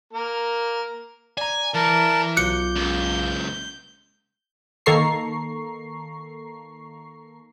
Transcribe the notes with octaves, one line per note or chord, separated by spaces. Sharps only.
A#3 A#4
D5 G#5 A#5
E3 A#4 A5
B1 F4 D6 F#6 G6 C#7
C#2 F#2
D#3 A#3 A4 A#5 C#6 C7